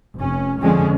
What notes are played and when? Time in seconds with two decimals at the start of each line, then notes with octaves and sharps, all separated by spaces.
0.17 F1 C#4
0.61 F2 D3 F3 G#3 C#4